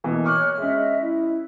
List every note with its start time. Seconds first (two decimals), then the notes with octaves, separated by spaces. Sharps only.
0.04 B2 E3 A#3
0.26 C#5 C#6 D6 F6 F#6
0.58 G#3 C#4 D#5 E5
1.01 E4